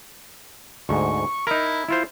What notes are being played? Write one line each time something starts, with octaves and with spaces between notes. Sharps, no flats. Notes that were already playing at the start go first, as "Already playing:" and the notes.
D2 G#2 C#6
D#4 E4 A#4
E4 F4 C5